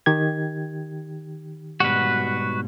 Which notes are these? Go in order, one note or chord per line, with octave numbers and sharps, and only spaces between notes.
D#3 G4 G#6
G#2 B2 G3 F#4 B4